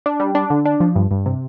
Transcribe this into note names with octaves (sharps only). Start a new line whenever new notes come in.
D4
G3
D4
D3
D4
F3
G2
G2
C3